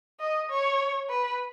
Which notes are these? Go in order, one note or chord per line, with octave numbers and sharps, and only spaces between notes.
D#5
C#5
B4